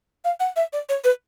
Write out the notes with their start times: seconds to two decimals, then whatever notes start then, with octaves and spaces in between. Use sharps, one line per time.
0.24 F5
0.40 F#5
0.56 E5
0.73 D5
0.89 C#5
1.04 B4